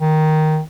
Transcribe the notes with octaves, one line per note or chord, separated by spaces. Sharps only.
D#3